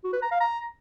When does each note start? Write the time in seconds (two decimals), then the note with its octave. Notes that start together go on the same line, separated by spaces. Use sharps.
0.04 F#4
0.13 B4
0.22 A#5
0.32 F5
0.41 A#5